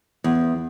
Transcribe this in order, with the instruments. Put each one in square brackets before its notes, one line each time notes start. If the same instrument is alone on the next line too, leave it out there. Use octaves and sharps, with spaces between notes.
[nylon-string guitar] E2